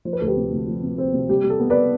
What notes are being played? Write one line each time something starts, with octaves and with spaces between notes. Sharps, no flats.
F3 C5
B4
D2 A4
G4 B4
C3
D2
F3
C3
C4
C3
G3 G4
G3
A4
B3
B4 D5